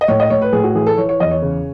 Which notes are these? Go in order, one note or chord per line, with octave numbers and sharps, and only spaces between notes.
D#5
A2 C#5
D#5
A2 C#5
B4
A2 G#4
F#4
E3 G#4
A4
E3 C#5
C#5
E2 D#5
C#5
C#3